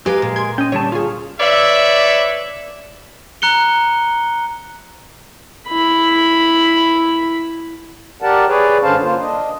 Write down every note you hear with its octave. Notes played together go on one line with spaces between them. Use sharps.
G#3 G4 G#4 A#4 B4 F5
A#2
C6 G#6
C#4 D#5 G5
D3 G3 C#5 A5
F4 G#4 F5 C#6
B4 C#5 D5 E5
A#5 F#6 C#7 G7
E4 B5
G4 A#4 D5 F#5 A5
G#4 B4 C#5 D5
G2 D3 C#4 C5 F5 A5
A#3 F4 C5
D4 D#5